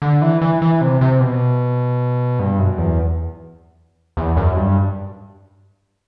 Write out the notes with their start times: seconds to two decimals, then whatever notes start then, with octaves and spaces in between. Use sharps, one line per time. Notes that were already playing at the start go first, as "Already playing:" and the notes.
0.02 D3
0.22 E3
0.41 E3
0.62 E3
0.81 C3
1.01 C3
1.20 B2
2.39 G2
2.59 F#2
2.78 E2
4.17 E2
4.37 F#2
4.57 G2